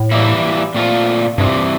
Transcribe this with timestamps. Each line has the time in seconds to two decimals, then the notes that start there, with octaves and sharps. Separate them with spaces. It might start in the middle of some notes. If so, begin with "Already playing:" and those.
Already playing: A2
0.11 E3 G3 A#3 E4
0.74 A#2 A3 C4 F4
1.38 G2 C3 E3 G3 C4